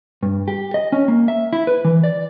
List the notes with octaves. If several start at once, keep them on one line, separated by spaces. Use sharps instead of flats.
G2
G4
D#5
C#4
A#3
E5
E4
B4
E3
D5